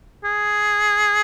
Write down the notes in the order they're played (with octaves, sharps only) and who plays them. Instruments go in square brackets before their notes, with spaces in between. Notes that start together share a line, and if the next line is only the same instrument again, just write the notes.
[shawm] G#4